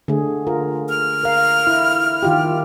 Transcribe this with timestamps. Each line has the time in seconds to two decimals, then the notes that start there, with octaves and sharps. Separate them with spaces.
0.08 D3 A3 G#4
0.47 F4 A#4
0.89 F6
1.24 A#4 F5
1.67 E4
2.23 D#3 F4 G4